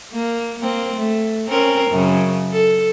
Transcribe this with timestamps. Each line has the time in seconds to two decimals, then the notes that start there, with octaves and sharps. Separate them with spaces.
0.13 A#3
0.59 A#3 C4
0.96 A3
1.48 C4 C#4 A#4
1.90 F#2 C#3
2.51 A4